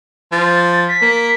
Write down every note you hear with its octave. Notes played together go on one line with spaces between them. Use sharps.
F3 A6
B6
A#3